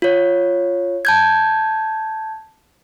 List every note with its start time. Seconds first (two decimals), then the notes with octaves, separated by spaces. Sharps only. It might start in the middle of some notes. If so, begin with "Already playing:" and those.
0.02 F4 C#5
1.05 A5 G6 G#6